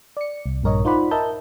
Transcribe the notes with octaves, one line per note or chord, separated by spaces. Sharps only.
D5 C#7
C2
A#1 G2 A#4 C#5 D#5
D#4 F4 C5 D5 F#5 B5
A#4 D#5 E5 A5 G6